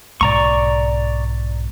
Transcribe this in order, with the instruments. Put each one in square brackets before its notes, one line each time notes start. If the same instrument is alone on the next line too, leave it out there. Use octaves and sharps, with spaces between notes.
[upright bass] B1 G#2 [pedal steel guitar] D5 A#5 C#6